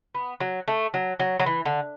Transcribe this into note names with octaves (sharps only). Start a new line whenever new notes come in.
B3
F#3
A3
F#3
F#3
F#3
E3
D3